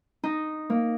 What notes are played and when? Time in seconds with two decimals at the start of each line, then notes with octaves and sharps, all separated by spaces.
0.23 D#4
0.70 A#3